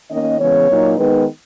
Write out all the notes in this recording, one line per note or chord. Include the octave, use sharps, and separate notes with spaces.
D#3 A#3 C#4 D#5
C#3 E3 G#3 B3 C#5
A#2 F#3 A#3 D#4
D#3 G#3 B3 D#4 B4